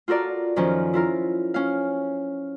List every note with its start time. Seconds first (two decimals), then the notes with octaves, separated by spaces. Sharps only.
0.08 F4 F#4 A4 A#4 D5
0.56 F#2 D#3 F3 C#4
0.94 E4 F4 A#4
1.54 C#4 F5